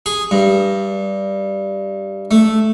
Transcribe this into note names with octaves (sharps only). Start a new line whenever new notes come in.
G#4
G2
A3